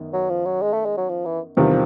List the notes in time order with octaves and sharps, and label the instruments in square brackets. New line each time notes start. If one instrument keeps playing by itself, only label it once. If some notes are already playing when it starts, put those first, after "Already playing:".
Already playing: [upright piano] F#2 D#3 B3
[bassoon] F#3
F3
F#3
G#3
A3
G#3
F#3
F3
E3
[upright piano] E2 C3 D#3 G3 [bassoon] F3